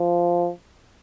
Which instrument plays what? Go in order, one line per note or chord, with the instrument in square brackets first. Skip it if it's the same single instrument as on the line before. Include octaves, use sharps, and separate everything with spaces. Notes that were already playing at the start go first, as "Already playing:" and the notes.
Already playing: [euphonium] F3